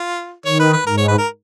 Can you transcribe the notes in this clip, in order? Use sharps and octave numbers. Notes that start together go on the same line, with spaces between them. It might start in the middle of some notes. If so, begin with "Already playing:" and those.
Already playing: F4
D#3 C#5
B4
B4
G#2 A#4
C#5
B4
A#4